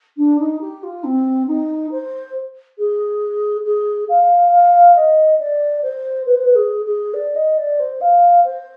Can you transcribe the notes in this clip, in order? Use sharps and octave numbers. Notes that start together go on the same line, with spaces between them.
D4
D#4
G4
F4
C4
D#4
C5
G#4
G#4
F5
F5
D#5
D5
C5
B4
C5
B4
G#4
G#4
D5
D#5
D5
C5
F5
C5